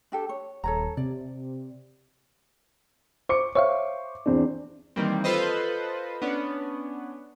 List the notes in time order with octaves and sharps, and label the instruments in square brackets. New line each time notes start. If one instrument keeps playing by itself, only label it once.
[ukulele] D4 G4 A4
C#5
[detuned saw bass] D#1 [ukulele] A4 C#5 A#5
[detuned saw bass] C3 [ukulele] D5
[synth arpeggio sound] C5 [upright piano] C#6 D6 C#7
[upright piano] C5 C#6 [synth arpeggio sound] C#5 E5 F5
[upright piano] E2 C4 D4
[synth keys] D#3 E3 G3 A#3 C4
F4 A4 B4 C5 D#5
B3 C#4 D4